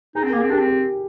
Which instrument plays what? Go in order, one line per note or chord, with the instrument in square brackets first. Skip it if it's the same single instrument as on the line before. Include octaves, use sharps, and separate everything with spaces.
[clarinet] D#4 [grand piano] G#4
[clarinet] C4
[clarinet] A#3 [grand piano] A#4
[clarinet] C4 [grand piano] G#4
[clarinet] D4 [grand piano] G4
[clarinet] C4
[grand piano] G4